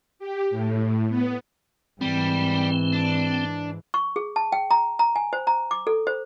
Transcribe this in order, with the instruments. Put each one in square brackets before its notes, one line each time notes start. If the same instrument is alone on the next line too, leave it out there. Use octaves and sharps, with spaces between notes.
[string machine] G4
A2
B3
[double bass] G#2 E3 [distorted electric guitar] G3 [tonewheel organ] C4
[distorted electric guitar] D4
[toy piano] C#6
G#4
A5
G5
A#5
A#5
G#5
C5
A#5
D6
A4
C5